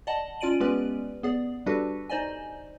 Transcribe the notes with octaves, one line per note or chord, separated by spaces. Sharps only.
D5 D#5 F#5 A5
C#4 F4 D5 D7 D#7 F#7
G#3 B3 C#4 G4 B4 D5
B3 G#4 D5
G3 D4 F#4 G4 A4 B4
D#4 C5 D5 D#5 G#5